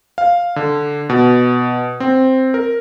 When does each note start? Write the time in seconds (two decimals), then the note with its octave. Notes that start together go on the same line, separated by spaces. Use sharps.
0.18 F5
0.56 D3
1.10 B2
2.00 C4
2.54 A#4